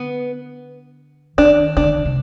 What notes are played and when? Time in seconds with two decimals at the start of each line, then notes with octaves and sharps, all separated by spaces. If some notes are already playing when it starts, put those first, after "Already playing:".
Already playing: D3 B3
1.38 D#3 D4
1.77 D3 D4
2.06 C3